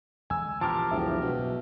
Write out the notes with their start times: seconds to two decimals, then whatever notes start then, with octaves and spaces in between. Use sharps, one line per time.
0.30 E2 D3 G#3 G#5 E6
0.61 A#1 E2 F3 G4 A#4 A5
0.91 E1 C#2 F#2 B2 E5
1.21 B1 G#2 B2